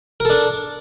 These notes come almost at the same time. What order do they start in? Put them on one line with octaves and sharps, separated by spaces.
A#4 A4 D4